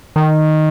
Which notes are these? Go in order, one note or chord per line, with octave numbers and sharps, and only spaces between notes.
D#3